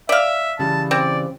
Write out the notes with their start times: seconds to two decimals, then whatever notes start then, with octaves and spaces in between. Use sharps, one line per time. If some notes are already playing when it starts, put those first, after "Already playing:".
0.09 D5 E5 F5
0.59 C#3 E3 G3 A5
0.91 C4 D5